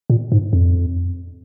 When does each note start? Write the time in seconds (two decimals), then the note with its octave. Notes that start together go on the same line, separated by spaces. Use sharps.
0.10 A#2
0.32 G#2
0.53 F2